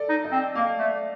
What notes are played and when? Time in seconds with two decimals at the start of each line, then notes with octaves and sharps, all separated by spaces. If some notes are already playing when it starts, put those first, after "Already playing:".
Already playing: A4 D5
0.09 D#4
0.24 D#5
0.32 C4
0.55 A#3 F5
0.79 A3